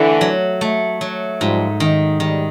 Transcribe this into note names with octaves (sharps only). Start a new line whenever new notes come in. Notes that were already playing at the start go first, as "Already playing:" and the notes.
Already playing: D3 E3 A3
F#3
A3
F#3
G#2 F3 G3
D#3
D#3 G3